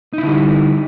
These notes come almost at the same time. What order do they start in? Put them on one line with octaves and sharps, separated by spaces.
D#4 E4 D3 G3